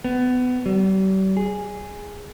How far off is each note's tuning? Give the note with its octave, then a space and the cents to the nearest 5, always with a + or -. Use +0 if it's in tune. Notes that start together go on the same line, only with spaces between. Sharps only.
B3 +25
G3 -40
G#4 -5